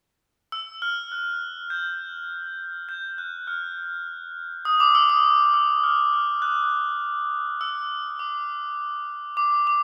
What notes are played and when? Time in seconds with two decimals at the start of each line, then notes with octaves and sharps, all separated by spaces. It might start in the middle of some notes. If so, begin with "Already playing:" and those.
0.52 E6
0.82 F6
1.12 F#6
1.70 G6
2.89 G6
3.18 F#6
3.47 F6
4.65 D#6
4.80 D6
4.95 E6
5.10 D#6
5.24 D#6
5.54 E6
5.83 F6
6.13 F6
6.42 F#6
7.61 E6
8.19 D6
9.37 D6
9.67 D6